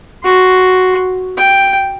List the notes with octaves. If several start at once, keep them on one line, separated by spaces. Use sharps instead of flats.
F#4 C6
G5